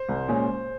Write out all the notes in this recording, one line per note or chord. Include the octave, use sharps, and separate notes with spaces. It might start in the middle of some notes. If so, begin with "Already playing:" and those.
Already playing: C5
C2
A#2 G#3 C#4